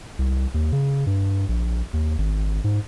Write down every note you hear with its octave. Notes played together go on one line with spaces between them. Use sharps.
C2
D#2
C#3
G2
A#1
D#2
G#1
G#2